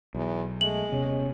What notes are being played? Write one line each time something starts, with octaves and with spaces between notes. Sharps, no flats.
B1 E2
G#3 A3 F#7
D#1 C3 B3 C#4